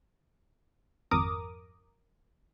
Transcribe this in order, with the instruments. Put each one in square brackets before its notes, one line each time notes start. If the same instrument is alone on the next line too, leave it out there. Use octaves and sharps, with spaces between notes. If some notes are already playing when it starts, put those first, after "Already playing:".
[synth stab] G#1 F2 A#4 A#5 D6 D#6